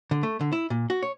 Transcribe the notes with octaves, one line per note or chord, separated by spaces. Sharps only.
D3
A3
D3
E4
A#2
F#4
C#5